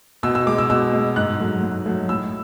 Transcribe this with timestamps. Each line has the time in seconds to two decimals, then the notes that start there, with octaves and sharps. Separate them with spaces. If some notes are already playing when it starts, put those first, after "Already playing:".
0.23 B2 E6
0.35 E6
0.47 G#3 D6
0.58 E6
0.69 B2 E6
0.93 G#3
1.16 G#2 F#6
1.39 F#3 A3
1.63 G#2
1.86 F#3 A3
2.09 A2 E6